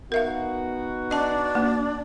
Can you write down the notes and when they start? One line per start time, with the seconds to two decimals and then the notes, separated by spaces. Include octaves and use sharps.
0.12 B3 D#4 F#4 A#4 E5 F5
1.11 D4 D#5 A5
1.55 A#3